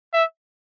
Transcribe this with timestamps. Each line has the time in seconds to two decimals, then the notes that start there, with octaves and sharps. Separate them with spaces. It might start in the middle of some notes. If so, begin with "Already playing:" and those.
0.13 E5